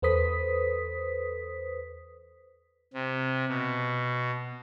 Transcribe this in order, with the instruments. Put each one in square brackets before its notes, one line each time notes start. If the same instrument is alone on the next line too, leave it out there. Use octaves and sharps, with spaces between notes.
[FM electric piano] E2 A4 B4 C5 D#6 B6
[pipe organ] C3
B2